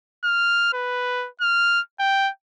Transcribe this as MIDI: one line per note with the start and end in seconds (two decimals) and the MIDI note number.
0.24 0.71 89
0.73 1.28 71
1.41 1.80 89
1.99 2.30 79